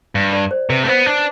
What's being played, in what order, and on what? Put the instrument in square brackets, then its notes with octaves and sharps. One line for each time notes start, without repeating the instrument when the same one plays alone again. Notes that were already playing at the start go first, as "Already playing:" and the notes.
[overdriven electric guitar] G2
[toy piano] D5
C5
[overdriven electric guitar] C3 [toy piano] B4
[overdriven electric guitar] A3
[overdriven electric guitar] B3 [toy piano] C5
[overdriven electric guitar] D4